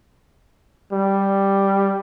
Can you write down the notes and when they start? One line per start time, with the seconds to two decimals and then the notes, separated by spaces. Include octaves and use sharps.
0.93 G3